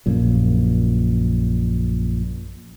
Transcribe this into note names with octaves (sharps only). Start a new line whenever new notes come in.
A#1 F#2 A#2